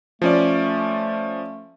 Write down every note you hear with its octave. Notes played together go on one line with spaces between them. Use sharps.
F3 A3 C#4 D5